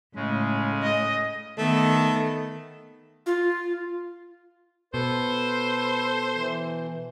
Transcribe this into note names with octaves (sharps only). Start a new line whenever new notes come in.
A2 C#3 G#3
D#5
D#3 A3 B3
F4
B2 A4 B4 C5
E3